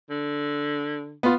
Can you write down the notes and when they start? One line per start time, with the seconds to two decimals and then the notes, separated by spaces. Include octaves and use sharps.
0.10 D3
1.23 B3 F4